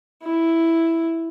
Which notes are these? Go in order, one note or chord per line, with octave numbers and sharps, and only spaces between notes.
E4